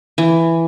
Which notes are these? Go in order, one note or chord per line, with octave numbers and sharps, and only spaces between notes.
E3